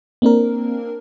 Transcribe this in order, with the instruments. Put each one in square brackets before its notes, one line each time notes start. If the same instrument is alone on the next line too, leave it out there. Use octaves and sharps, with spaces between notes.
[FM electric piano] A#3 C4 D4 A#4